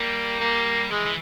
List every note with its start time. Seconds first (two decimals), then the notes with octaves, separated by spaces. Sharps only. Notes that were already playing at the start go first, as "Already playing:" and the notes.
Already playing: G3 A#3
0.40 A#3
0.90 E3 G#3
1.06 E3